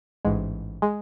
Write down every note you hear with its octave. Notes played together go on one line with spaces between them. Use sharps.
A1 G#2 G#3
G#3